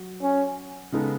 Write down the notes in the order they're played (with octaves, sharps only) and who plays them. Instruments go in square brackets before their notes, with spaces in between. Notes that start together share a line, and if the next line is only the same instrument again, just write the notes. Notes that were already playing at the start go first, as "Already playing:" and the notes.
Already playing: [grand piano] F#3 F#4
[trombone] C#4
[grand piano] C#3 G#3 B3 D#4 A4